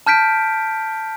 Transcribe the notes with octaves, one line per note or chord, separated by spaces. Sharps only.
A5 F6 G6 B6 D7